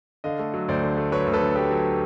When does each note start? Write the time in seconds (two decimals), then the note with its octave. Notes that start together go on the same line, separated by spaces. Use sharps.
0.24 D3 D#5 F5
0.39 A3
0.54 F#3
0.68 D2 C5 D5
0.83 D3
0.97 A3
1.12 F#3 B4 C#5
1.27 D2
1.33 A4 B4
1.41 D3
1.56 A3 G4 A4
1.71 F#3